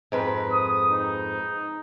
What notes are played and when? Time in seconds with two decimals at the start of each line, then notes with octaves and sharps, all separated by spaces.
0.12 F2 G#2 B4
0.52 D#6
0.91 D#4